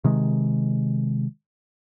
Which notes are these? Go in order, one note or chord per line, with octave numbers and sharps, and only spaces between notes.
C3 D#3 G#3